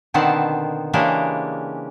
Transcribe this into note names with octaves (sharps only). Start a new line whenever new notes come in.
B2 D3 D#3 B3 C4 A5
C#3 E3 G#3 A#3 D4 G4